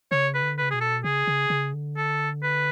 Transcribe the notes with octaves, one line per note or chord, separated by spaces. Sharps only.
C#3 C#5
B4
D3
C#3 B4
B2 G#4
A4
C#3 G#4
C#3
C#3
D3
A4
B4